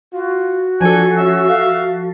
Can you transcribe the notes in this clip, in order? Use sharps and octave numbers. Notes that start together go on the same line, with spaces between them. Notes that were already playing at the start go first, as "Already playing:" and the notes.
F4 F#4
F3 D4 A4 G#5
C#4 E5
F5